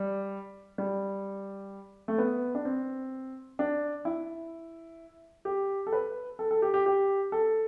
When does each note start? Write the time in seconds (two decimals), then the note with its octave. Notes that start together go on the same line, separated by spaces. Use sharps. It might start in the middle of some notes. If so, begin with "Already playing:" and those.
Already playing: G3
0.78 G3
2.08 A3
2.18 B3
2.55 D4
2.65 C4
3.59 D4
4.05 E4
5.45 G4
5.87 A4
5.93 B4
6.39 A4
6.51 A4
6.62 G4
6.74 G4
6.86 G4
7.32 A4